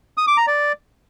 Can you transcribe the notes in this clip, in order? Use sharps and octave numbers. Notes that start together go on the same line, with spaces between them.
D#6
D6
A#5
D5